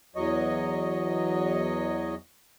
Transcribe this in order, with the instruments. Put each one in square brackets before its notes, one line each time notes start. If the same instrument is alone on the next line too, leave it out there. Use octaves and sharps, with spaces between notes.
[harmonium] E2 F#3 C#5 D#5